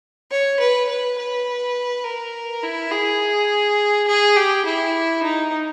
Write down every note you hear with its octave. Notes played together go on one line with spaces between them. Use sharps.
C#5
B4
B4
B4
A#4
E4
G#4
G#4
G4
E4
D#4